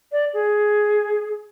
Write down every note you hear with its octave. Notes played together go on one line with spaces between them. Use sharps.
D5
G#4